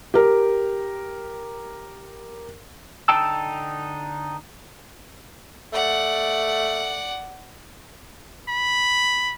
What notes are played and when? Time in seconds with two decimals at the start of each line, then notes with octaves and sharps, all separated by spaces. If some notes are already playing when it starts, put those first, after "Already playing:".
0.14 G4 A#4
3.08 D3 D#4 G5 A5 E6
5.73 A3 D5 F#5
8.48 B5